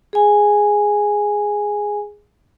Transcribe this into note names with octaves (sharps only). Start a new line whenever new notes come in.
G#4 G#5